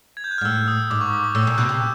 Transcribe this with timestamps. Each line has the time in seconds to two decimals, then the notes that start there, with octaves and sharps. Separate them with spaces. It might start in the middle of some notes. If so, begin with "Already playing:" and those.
0.17 G#6
0.24 G6
0.31 F#6
0.38 F6
0.41 G#2
0.45 A2 E6
0.68 D#6
0.90 G#2 D6
1.01 C#6
1.13 D6
1.24 D6
1.35 A2 E6
1.47 A#2
1.58 B2 F#6
1.69 C3